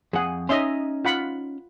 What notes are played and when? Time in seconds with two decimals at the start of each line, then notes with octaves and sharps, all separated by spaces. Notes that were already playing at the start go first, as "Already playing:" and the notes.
0.13 F2 G#4 F#5
0.49 C#4 D#4 D#5 E5 C6
1.05 F4 F#5 B5